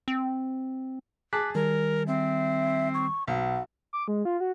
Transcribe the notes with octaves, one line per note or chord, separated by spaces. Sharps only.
C4
G#4 A5 D6 F#6 B6
D#3 G3 A#4
C4 E5
C#6
B1 F#5
D6
G#3
F4
F#4